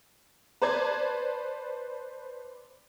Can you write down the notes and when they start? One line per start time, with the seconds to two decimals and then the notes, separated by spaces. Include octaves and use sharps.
0.62 B4 C5 D5 A5 G#6